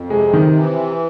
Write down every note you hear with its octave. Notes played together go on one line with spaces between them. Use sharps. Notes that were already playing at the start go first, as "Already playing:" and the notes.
Already playing: F2
C3 G#3
D#3
E3